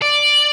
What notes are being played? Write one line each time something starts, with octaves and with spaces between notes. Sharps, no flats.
D5